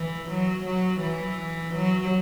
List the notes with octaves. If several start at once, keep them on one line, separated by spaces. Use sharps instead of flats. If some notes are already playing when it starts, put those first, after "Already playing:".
Already playing: E3
F#3
F#3
E3
F#3